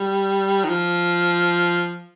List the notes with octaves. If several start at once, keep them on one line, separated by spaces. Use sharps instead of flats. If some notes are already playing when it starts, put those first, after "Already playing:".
Already playing: G3
D#3
F3